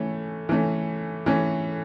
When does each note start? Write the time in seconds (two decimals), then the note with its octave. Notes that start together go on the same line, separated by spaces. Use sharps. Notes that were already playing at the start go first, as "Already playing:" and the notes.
Already playing: E3 A3 C#4
0.49 E3 A3 C#4
1.26 E3 A3 C#4